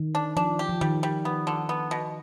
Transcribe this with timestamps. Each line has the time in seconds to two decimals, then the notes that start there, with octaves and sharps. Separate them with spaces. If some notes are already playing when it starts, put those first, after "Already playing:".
Already playing: D#3
0.15 D4
0.36 F3 D4
0.59 G4
0.69 F3
0.81 D#3 G3
1.03 G3
1.25 B3
1.47 D3
1.69 B3
1.91 B2